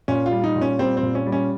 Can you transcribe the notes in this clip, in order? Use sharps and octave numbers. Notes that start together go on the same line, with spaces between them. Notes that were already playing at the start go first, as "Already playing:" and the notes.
A#2 C#4
F4
G3
D#4
A#2
C#4
G3 C4
C4
A#2
C#4
G3
C#4